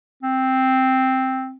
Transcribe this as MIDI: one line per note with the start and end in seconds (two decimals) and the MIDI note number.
0.23 1.56 60